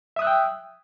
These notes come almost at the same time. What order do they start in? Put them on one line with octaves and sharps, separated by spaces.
E5 D#6 F#6 E6 G5